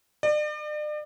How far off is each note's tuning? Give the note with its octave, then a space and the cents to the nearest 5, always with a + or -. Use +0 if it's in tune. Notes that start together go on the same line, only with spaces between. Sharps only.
D5 +40